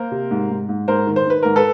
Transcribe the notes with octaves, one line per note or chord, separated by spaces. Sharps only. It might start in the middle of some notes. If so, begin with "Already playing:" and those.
Already playing: A#3 A#4 C5
C3
G#2
G#2
G#2
G#2 A#4 C5
D#3
C5
D#3 B4
G#2 A#4
A4 B4